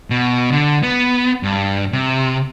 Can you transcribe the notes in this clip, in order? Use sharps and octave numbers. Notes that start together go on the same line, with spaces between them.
B2
D3
B3
G2
C3